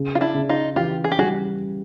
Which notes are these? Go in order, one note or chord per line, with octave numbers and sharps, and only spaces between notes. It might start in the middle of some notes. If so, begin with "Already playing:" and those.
Already playing: C#3
F4
D4 E4
C#3
D#4 F4
E3 F4 G4
G#4
G4
G3 F#4 G#4